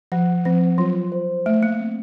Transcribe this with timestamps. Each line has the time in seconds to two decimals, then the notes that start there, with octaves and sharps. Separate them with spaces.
0.12 F3 F#5
0.45 F3 C4
0.78 F#3 F4
1.12 C5
1.45 A3 F#5
1.63 A#3
1.79 C4